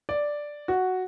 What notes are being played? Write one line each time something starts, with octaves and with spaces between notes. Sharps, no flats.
D5
F#4